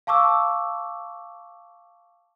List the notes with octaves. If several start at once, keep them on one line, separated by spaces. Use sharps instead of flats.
F5 A5 C#6 D6 E6